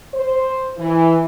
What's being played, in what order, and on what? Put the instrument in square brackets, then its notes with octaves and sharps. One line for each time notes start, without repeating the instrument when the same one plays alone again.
[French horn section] C5
E3